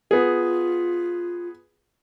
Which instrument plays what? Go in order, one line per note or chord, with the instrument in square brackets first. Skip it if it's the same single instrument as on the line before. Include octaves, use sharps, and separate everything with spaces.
[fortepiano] B3 G#4 [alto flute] F4